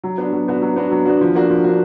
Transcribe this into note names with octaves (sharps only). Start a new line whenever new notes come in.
F#3
B3 D4 F#4
F#3
B3 D4 F#4
F#3
B3 D4 F#4
F#3
B3 D4 F#4
F3
A#3 D4 F#4
F3
A#3 D4 F#4